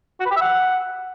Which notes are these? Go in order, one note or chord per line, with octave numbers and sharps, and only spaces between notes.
F#4
B4
G4
E5
F#5